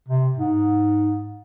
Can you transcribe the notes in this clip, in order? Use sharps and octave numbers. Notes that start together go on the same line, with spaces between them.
C3
G#2